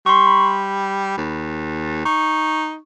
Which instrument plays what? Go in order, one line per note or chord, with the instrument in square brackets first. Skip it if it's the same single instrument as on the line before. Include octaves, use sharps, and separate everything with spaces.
[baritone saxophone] G3 [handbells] C6 C#6
[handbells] B5
[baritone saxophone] D#2
[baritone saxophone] D#4 [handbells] C#6